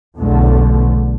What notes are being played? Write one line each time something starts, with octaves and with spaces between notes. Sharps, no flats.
B1 E2 D3 A3